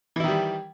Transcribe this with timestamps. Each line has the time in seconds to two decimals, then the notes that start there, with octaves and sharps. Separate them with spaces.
0.16 E3
0.20 E4
0.24 D#3
0.28 G3